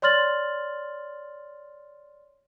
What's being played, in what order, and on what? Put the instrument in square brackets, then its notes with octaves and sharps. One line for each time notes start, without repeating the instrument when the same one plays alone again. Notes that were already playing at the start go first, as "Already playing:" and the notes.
[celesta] C#5 D5 C6 F6 A6 F#7